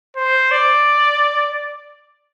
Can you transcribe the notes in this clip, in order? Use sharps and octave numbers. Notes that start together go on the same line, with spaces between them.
C5
D5